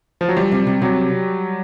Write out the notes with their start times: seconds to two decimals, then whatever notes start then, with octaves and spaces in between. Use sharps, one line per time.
0.21 F3
0.29 F#3
0.37 F3 G3
0.52 C3
0.67 C3
0.82 C3 F#3